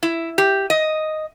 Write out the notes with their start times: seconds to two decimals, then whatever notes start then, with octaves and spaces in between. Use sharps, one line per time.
0.03 E4
0.38 G4
0.70 D#5